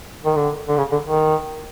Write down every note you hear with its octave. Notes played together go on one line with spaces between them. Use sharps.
D#3
D3
D3
C#3
D3
D#3